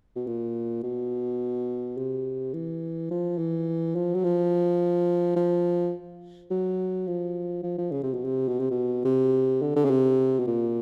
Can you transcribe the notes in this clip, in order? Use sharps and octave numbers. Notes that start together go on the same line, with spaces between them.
B2
A#2
B2
C3
E3
F3
E3
F3
F#3
F3
F3
F#3
F3
F3
F3
C#3
C3
B2
C3
B2
C3
B2
C3
D3
D3
C#3
C3
B2
A#2